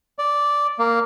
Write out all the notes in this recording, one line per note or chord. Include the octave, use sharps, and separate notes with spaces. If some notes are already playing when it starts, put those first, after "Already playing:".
D5
A#3